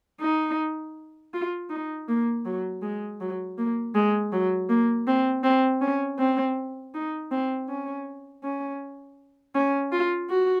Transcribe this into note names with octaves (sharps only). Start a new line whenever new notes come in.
D#4
F4
D#4
A#3
F#3
G#3
F#3
A#3
G#3
F#3
A#3
C4
C4
C#4
C4
D#4
C4
C#4
C#4
C#4
F4
F#4